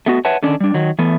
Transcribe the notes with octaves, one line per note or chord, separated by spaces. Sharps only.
A3 B3 F#4
B4 C#5 E5 F#5 A5
D3 D#3 C#4 D4
G3 D4
D#3 F#3
E3 A3 B3